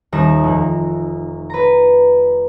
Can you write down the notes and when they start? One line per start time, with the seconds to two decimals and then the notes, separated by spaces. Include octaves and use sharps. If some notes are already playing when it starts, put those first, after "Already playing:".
0.12 D#1 D#2 D#4 A#5 E7
0.44 F1
1.50 B4 A#5